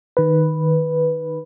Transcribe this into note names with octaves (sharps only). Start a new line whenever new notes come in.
D#3 B4